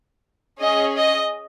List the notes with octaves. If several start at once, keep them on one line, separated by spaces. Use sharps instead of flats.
C#4 G#4 D#5
D#5